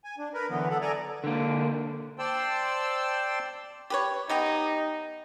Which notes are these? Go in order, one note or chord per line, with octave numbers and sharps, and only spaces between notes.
G#5
D4
A#4 B4
D3 E3 F#3 B3
A4 F#5
A4 D5 G#5 A#5
D3 A#3
C5 D5 G5 A5 C6 E6
G4 B4 C#5
B3 D#4 G4 D#5